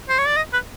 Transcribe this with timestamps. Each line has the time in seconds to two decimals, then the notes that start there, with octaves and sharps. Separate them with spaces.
0.09 C5
0.18 C#5
0.27 D5
0.36 D#5
0.53 B4